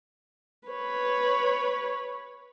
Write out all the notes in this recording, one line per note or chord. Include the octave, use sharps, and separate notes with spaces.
B4 C#5